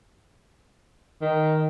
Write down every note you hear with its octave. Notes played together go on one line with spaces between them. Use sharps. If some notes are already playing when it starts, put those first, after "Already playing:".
D#3